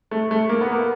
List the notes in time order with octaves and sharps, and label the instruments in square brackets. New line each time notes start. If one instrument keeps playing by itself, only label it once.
[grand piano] A3
A3
A#3
B3
A#3